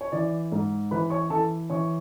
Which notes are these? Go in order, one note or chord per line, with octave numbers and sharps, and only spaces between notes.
C#5
E3 D5
G#2
E3 B4 B5
C#5 C#6
E3 A4 A5
E3 C#5 C#6